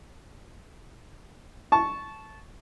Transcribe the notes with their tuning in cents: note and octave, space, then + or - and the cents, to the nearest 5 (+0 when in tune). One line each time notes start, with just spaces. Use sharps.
A5 -15 C#6 +0